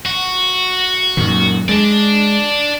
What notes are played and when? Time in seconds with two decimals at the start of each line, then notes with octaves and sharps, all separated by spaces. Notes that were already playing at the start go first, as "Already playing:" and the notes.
0.05 F#4
1.17 F#2 A#2 D#3
1.69 G#3 D5 A5